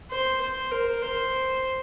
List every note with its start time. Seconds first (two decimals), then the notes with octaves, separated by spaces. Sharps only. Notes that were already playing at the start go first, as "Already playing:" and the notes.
0.11 C5
0.41 C5
0.71 A#4
1.02 C5